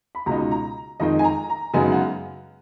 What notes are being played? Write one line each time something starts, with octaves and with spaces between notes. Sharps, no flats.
B5
C#2 B2 G#3 D#4 A#5
A#5
F2 D#3 G#3 D#4 D#5
G#5
A#5
A#5
F#2 C#3 G#3 B3 D#4 G#5
F#5